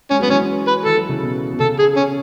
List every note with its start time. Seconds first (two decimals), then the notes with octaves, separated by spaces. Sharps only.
0.11 G#3 C#4
0.20 F#3 B3
0.29 E3 G#3 C#4
0.68 B4
0.85 E3 A4
0.97 F#3
1.09 C#3 E3
1.23 B2
1.53 B2
1.60 C#3 A4
1.79 G#4
1.96 C#4